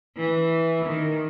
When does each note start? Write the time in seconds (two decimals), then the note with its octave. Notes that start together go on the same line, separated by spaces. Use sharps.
0.17 E3
0.86 D#3